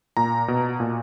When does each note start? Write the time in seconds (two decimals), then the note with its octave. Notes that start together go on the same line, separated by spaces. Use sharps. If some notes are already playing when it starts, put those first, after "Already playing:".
0.17 A#2 A#5
0.48 B2
0.80 A#2